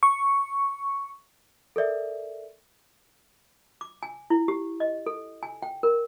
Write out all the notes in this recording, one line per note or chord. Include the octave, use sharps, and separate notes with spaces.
C#6
A4 A#4 D5 E5
D6
G#5
E4
G4
D#5
A4
G#5
G5
A#4